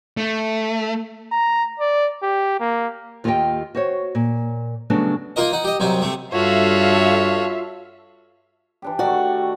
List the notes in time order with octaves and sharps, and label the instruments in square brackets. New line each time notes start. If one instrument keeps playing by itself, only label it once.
[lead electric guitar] A3
[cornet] A#5
D5
G4
A#3
[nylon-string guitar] D#2 F4 G4 B4 D#5 G5
F#4 C5 C#5
A#2
C#3 F#3 G3 A3 B3 D4
[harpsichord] A#3 D#4 F4 A#4 D#5
D#4 F#5
G4 D#5
C2 F#2 C3 D#4
C3 A3
[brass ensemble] G2 [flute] F4 [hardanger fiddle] F#4 C#5 [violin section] A4 E5 F5
[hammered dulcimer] E3 D4 G4
[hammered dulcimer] D#3 A3 [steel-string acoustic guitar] F#4 D5